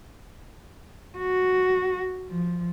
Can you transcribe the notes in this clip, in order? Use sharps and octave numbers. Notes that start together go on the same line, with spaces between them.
F#4
F3